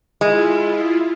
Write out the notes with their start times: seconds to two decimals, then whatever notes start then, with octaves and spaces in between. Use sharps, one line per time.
0.21 G#3 E4 F4